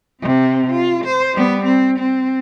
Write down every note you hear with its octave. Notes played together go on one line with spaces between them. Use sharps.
C3 C4
F4
C5
G3 B3
C4
C4